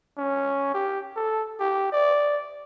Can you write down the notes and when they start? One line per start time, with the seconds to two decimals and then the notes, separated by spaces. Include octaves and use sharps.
0.18 C#4
0.75 G4
1.17 A4
1.60 G4
1.93 D5